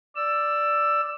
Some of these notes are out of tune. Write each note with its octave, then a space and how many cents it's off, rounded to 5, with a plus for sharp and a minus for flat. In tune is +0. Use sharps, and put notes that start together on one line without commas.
D5 +0 E6 +15